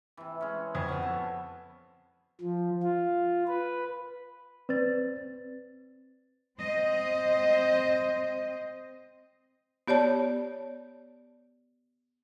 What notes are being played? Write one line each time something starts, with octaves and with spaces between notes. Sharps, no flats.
C3 E3
G#3 C#4
F2 F#4 G#5 G#6
B3 C#4
A4
F3
F4
B4
C4 B4 D5 A6
C4 C5 D#5
B3 G4 C#5 D5 A5